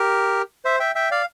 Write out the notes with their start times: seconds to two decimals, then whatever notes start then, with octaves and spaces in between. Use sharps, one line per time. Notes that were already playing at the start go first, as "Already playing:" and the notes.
Already playing: G4 A#4
0.65 C5 E5
0.80 E5 G5
0.95 E5 G5
1.11 D5 F5